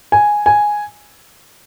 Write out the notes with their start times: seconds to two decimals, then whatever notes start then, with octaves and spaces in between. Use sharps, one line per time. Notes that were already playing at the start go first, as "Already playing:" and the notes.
0.12 G#5
0.46 G#5